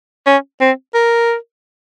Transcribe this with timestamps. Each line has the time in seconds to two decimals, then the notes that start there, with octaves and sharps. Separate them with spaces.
0.26 C#4
0.61 C4
0.94 A#4